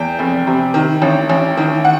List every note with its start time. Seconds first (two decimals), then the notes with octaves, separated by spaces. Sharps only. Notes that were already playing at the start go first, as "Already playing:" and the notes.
Already playing: E2 G5
0.19 F1
0.47 C3
0.74 D#3
1.02 A1
1.29 A1
1.57 D#3
1.85 F#5